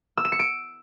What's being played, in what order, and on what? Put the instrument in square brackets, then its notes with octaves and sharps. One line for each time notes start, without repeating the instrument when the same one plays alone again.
[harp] E6
E7
C#7
D7